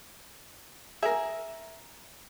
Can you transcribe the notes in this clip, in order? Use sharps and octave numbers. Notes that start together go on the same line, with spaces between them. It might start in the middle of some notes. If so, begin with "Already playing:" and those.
G#4 A#4 E5